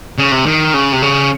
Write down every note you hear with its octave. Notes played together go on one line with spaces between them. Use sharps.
C#3
C3
D#3
C#3
C3
C#3